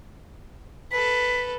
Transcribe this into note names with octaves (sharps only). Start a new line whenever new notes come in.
A4 B4 B6